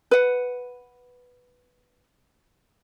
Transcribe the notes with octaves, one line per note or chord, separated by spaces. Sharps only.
B4 F#5